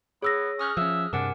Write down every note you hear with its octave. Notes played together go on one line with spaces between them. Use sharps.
B3 G#4 C#5 E6 A#6
C#4 D#6 F6 F#6
F3 C#4 E5
G2 C3 D4 A#4 F#5 G#5